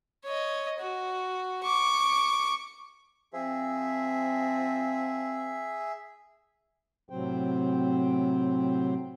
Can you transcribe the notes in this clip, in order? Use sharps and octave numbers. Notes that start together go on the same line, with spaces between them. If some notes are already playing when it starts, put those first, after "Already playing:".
C#5 D#5
F#4
C#6 D6
F3 C4 G#4 E5
A2 C3 F#3 C4 C5 G5